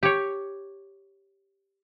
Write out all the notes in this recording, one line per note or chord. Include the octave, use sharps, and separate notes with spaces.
G4 C#5